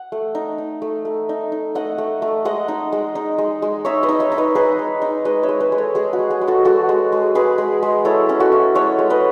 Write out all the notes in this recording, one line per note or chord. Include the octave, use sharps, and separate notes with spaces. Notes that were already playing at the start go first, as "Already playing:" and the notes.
Already playing: F#5
A3
D#4
D#4
A3
A3
D#4
D#4
A3 D#5 F#5
A3
A3
G#3 D#5 F#5
D#4
G#3
D#4
G#3
G#3
D#4 C#5 E5
B4 D#5
D#4
C#5 E5
D#4
B4 D#5
D#4 G#4 B4
G#3
D#4
G#3 B4 D#5
C#5 E5
G#3
B4 D#5
G#3
A4 C#5
G#3 G#4
F#4
G#3
G#4
G#3
F#4 A4
G#3 F#4 A4
G#3
G#3
G#3 G#4 B4
G#3
G#3
E4 A4 C#5
C#4
F#4 A4
E4
G#3 A4 C#5
G#3
B4 D#5